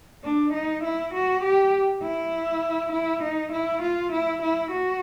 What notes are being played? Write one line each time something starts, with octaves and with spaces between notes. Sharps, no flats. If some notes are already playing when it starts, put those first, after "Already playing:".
D4
D#4
E4
F#4
G4
E4
E4
D#4
E4
F4
E4
E4
F#4